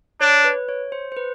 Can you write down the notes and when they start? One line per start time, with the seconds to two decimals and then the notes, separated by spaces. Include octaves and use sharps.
0.21 D4 C#5
0.44 B4
0.69 C#5
0.92 C5
1.12 C5
1.17 B4